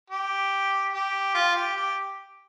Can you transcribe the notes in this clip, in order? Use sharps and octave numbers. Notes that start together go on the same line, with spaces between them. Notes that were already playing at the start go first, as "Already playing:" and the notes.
G4
G4
F4
G4
G4